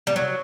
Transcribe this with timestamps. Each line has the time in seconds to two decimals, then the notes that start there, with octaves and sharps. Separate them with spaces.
0.07 G3
0.16 F#3